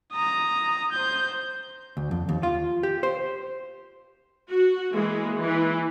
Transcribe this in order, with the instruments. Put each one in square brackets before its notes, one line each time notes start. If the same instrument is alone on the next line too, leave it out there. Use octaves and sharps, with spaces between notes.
[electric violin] A#5 D#6
C5 G6
[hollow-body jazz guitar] D2
F2
D#2
F4
G4
C5
[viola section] F#4
E3 G#3 A#3
E3